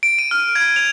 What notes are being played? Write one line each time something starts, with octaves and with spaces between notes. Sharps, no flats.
D7
D#7
F6
G#6
F7